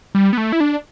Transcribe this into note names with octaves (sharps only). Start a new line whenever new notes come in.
G3
B3
A3
E4
D4